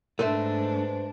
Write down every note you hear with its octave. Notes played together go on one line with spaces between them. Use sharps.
G#2 A3 D4 B4 C5 E5